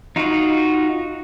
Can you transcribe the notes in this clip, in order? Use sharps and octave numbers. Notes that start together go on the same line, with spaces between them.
D#4 F4 F#4